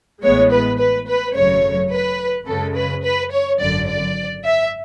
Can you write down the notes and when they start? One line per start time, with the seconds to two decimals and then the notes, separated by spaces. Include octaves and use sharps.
0.23 A1 A2 E3 G#3 B3 C#5
0.52 B4
0.79 B4
1.08 B4
1.35 G#1 F#2 C#3 F#3 A3 C#5
1.91 B4
2.47 F#2 C#3 G#3 A4
2.75 B4
3.04 B4
3.32 C#5
3.60 G#1 F#2 D3 D5
3.88 D5
4.44 E5